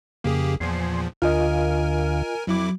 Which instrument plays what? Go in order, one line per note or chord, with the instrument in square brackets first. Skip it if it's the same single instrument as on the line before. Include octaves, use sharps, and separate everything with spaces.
[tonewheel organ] F2 C#3 [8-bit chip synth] A#3 G4 G#4
[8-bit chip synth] E2 A#2 F3 [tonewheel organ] G#5 C6
[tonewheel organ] D2 D3 F5 [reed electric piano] F4 D#5 [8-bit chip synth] A#4 G#5
[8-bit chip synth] F2 E4 D6 [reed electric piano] F#3